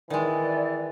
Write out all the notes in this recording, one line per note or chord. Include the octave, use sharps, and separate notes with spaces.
D#3 E3 G#3 D5